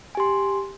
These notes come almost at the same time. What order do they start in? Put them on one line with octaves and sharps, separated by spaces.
G#5 G4 C6